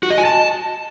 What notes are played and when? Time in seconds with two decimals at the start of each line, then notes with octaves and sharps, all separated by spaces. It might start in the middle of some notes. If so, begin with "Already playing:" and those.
0.03 F#4
0.10 D#5
0.18 G#5
0.25 A5